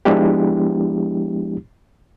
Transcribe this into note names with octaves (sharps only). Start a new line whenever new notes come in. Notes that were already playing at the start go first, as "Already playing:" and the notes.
F3 G#3 B3 D4 E4 G4